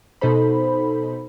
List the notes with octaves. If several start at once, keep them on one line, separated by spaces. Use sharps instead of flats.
B2 D#4 A4 C5 B5